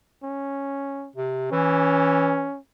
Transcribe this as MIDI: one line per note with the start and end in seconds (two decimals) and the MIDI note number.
0.23 1.09 61
1.16 1.51 48
1.52 2.48 52
1.52 2.58 61